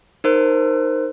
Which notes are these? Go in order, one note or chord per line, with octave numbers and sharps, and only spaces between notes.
D#4 A#4 C5